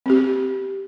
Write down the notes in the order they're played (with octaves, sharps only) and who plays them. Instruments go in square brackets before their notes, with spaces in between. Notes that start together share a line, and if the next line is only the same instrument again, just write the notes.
[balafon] C4 G4